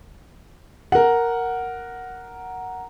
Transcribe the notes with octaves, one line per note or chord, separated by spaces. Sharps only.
A#4 F#5